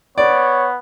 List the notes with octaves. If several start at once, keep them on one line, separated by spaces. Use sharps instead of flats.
B3 C#5 D5